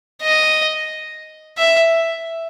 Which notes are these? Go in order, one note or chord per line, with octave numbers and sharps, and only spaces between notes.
D#5
E5